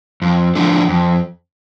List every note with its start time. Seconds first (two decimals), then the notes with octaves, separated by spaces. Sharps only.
0.22 F2
0.55 D3 F3 A3 D4
0.89 F2